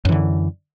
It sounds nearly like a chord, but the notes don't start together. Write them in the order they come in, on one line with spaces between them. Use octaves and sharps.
F#2 E3 D3